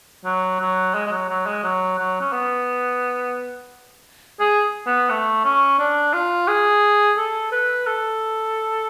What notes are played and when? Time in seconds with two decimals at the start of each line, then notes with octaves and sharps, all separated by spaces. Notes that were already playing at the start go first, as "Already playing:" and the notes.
0.25 F#3
0.60 F#3
0.94 G#3
1.07 G#3
1.12 F#3
1.29 F#3
1.46 G#3
1.64 F#3
1.98 F#3
2.21 C#4
2.32 B3
4.40 G#4
4.86 B3
5.10 A3
5.44 C#4
5.79 D4
6.13 F4
6.48 G#4
7.17 A4
7.52 B4
7.86 A4